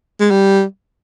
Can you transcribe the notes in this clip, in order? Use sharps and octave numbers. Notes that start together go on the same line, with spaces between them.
G#3
G3